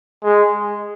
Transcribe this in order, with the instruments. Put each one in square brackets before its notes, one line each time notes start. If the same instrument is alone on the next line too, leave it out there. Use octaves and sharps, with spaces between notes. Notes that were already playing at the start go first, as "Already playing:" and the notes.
[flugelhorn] G#3